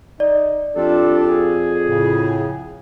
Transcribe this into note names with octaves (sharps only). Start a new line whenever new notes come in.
D#4 D5
F2 D4 F4 G4 A4
G#4
A2 C#3